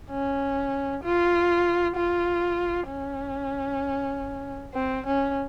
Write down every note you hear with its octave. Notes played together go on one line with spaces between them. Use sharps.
C#4
F4
F4
C#4
C4
C#4